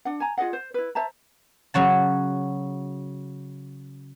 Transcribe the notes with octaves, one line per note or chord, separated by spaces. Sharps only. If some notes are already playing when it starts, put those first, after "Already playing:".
D4 F#5
G#5 A#5
F4 G#4 D#5 F#5
C5
E4 B4
C5 E5 A5 A#5
C#3 F#3 F#4 A5